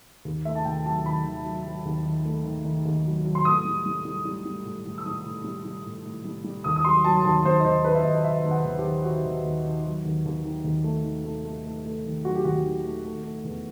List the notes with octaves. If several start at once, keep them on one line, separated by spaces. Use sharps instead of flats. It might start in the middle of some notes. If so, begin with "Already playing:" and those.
D#2
A3 E5
A5
D#2 G5
F#3 A5
D#3 B5
D#3
F#3
F#3
D#2
D#3
A3
D#3
D#3
D#2
F#3
F#3
C6
A2 D#6
G3
G3
G3
G3
G3
A2
A2
E6
G3 D#6
A2
G3
G3
A2
A2
G3
G3
D#2 D#6
D#6
F#3 C6
F#3 A5
D#2 A5
D#2 C5
D#5
D#2 C5
D#2 B4
E5
D#2 D#5
D#3 E5
D#2
F#5
D#2
G4
D#3
D#3 F#4
D#2
D#2
D#3
F#3
D#2
D#2
D#3
D#2
A3
D#3
A3
A3
A3
A3
D#3
F#3 F#4
G4
D#2 F#4
D#3
A3
A3
A3
E2